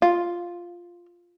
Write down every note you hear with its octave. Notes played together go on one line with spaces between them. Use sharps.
F4